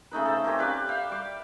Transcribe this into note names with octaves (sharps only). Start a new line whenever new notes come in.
C#3 A3 D#4 B4
A4 C5
C4 C#4 G4 A#4
G4 B4 D5 F5
E5 F5 G5
G3 D6